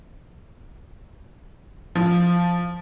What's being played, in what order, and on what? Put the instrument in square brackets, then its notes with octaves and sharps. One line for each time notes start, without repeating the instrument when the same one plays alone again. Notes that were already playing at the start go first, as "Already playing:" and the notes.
[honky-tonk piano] F3